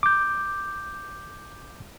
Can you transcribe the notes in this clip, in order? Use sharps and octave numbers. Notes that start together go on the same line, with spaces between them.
D6 G6